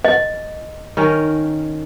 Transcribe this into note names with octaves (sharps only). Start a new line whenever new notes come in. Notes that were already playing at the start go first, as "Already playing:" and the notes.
D#5
D#3 C#4 A#4